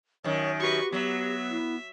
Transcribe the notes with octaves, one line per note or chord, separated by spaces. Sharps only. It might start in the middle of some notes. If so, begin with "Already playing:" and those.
F#2 D#3 C#5
F#4 G4 B4 C#6
F#3 B3 E5
E4